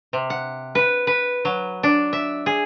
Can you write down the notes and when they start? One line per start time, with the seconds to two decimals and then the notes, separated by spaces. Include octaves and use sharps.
0.13 C3
0.30 F#5
0.75 B4
1.07 B4
1.45 F#3
1.83 D4
2.13 E5
2.46 G#4